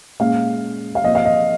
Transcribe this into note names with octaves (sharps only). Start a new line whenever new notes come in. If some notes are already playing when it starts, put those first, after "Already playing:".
A#2 G#3 C#4 F5
F5
A#2 F3 C4 D#5
F5
D#5